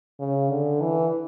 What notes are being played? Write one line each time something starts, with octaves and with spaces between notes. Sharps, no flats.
C#3
D3
E3